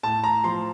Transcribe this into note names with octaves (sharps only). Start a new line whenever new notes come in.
A2 A5
A#5
F3 C6